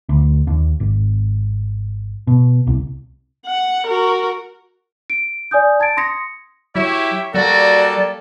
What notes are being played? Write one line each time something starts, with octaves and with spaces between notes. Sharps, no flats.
D2
D#2
G#1
B2
C2
F#5
F#4 A#4
D7
D5 G#5 D#6 G6
A5 G#6 A6 D7
C6 D#6 A#6 C#7
F#3 E4 G4 C#5 E5
F#3 G3 A#3 F#4 A4 D5